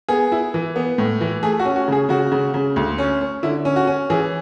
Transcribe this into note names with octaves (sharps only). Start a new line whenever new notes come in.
B3 G#4
E4
E3
B3
A2
E3
A3 G#4
F#4
C#4
F#4
C#3 G#4
C#3 F#4
C#3
C#3
D2
C#4
C#4
D3 E4
C#4
F#4
C#4
E3 G#4